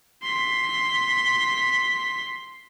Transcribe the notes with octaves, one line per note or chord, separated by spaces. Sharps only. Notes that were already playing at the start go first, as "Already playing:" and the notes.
C6 B6